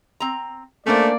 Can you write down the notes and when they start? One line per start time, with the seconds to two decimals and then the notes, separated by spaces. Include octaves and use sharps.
0.20 C4 A#5
0.86 A3 A#3 C#4 D4 C5 D5